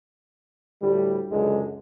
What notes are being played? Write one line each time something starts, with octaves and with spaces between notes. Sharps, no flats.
D2 A2 G3
C#2 F#2 D3 G#3